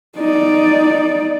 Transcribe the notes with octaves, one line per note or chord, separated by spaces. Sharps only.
D#4 D5